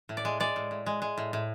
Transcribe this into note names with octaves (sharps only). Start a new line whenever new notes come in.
A2
D5
G#3
G#3 D5
A2
A2
G#3
G#3
A2
A2